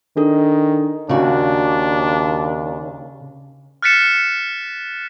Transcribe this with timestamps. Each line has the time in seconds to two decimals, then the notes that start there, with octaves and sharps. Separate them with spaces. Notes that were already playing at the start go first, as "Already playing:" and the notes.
0.17 D#3 D4 A4
1.09 D#2 C#3 D4 F#4
3.82 F6 F#6 A6 B6 C#7 E7